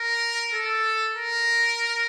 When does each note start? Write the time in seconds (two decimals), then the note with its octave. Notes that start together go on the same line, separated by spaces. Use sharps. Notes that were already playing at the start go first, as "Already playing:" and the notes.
Already playing: A#4
0.54 A4
1.17 A#4